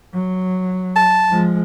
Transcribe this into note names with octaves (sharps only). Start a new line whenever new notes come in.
F#3
A5
F3 G#3